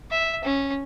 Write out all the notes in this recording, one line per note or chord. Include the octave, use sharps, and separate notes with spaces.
E5
C#4